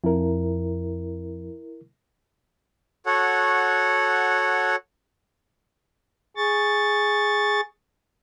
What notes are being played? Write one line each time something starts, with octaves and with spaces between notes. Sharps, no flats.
F2 E4 A#4
F#4 A4 C#5 F#5
G#4 C#6 A6